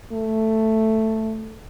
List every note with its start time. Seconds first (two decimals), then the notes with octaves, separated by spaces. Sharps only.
0.13 A3